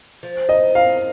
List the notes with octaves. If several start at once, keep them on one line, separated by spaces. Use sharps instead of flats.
F3
D#5
F5